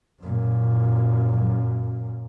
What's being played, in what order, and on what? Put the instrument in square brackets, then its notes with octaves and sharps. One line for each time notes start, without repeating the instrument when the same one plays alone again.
[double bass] F#2 A#2